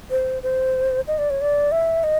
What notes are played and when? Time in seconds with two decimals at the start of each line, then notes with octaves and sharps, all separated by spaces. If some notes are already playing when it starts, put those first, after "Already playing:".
0.11 C5
0.43 C5
1.08 D#5
1.18 D5
1.30 C#5
1.41 D5
1.72 E5
2.04 D#5